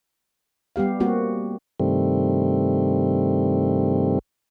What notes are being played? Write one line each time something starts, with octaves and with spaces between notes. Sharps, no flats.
G3 B3 G4 F5
G3 A#3 C4 F#4
G2 C3 D#3 G3 A3 C4